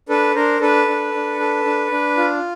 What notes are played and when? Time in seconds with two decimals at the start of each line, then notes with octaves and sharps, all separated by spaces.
0.09 D4 A4 B4
0.35 D4 A#4 C5
0.61 D4 A4 B4
0.87 D4
1.14 D4
1.40 A4
1.65 D4
1.91 D4
2.17 F4